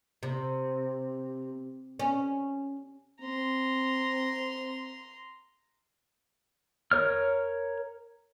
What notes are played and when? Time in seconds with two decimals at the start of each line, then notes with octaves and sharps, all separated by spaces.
0.23 C3
1.99 C#4
3.21 C4 A#5 C6
6.92 A#4 C#5 F6